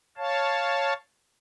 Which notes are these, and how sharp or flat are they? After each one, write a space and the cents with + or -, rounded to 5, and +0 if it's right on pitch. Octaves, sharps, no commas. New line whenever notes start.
C#5 +0 F5 +0 A5 +0